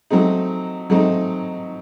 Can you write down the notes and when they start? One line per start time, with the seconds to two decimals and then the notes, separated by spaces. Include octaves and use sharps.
0.10 F#3 A3 C4 D#4
0.90 F#3 A3 C4 D#4